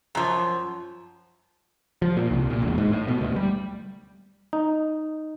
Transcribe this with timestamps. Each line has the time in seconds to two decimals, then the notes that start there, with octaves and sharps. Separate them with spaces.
0.15 F#2 F3
2.02 F3
2.17 A#2
2.31 C2
2.50 A#2
2.62 E1
2.78 G#2
2.92 A2
3.08 B2
3.21 D2
3.36 G3
4.53 D#4